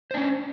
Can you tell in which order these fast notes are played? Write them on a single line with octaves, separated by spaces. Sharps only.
C5 D4 C#4